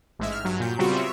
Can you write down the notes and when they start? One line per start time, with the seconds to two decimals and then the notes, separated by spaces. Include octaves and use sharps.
0.19 A1 G#2 G#3 E5
0.32 F6
0.44 G2 F#3
0.60 A#2 G6
0.79 C#3 G3 B3 C4 F4 F#4
0.96 C#5 E5